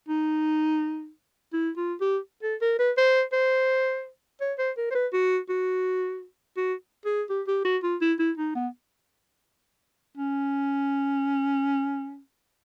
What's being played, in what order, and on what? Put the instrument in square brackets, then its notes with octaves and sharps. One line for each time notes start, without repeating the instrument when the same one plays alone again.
[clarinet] D#4
E4
F4
G4
A4
A#4
B4
C5
C5
C#5
C5
A#4
C5
B4
F#4
F#4
F#4
G#4
G4
G4
F#4
F4
E4
E4
D#4
B3
C#4